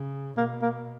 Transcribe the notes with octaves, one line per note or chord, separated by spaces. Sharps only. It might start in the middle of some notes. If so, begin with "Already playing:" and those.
Already playing: C#3
B2 A#3
A#3